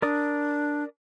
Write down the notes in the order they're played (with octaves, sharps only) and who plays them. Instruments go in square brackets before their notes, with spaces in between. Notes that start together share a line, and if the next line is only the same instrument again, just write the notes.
[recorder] D4 [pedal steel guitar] A#4 D5 D#6